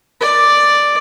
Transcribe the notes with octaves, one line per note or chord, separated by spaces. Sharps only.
D5